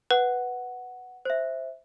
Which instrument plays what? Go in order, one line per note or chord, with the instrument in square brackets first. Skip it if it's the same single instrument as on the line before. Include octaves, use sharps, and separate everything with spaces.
[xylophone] B4 [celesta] F#5
[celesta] C5 E5